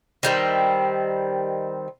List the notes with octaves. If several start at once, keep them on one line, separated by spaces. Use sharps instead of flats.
D#3 G3 C4